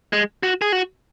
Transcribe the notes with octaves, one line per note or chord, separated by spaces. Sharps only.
G#3
F#4
G#4
F#4